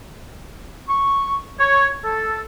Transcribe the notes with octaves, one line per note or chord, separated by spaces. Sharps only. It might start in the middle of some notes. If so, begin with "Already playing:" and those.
C#6
C#5
A4